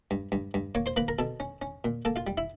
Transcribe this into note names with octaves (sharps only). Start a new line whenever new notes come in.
G2
G2
G2
A#3 C#5 C#6
C5 C6
A#3 B4 B5
A#4 A#5
B2 A4 A5
C#4
C#4
A#2
A#3 A4 A5
F4 F5
G3
E4 E5